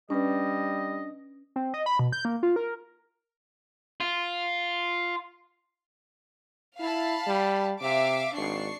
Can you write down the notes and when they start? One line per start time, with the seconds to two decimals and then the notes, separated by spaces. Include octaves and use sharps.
0.10 G3 C#4 D4 B4 D#5
1.56 C4
1.74 D#5
1.86 B5
1.99 B2
2.12 G6
2.25 A#3
2.43 F4
2.56 A#4
4.00 F4
6.80 E4 F5 A5 B5
7.27 G3
7.81 C3 E5 F5 D6
8.37 G#1 D4 C#6 C7